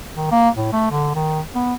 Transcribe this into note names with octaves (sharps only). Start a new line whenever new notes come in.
D#3
A#3
A2
A3
D3
D#3
B3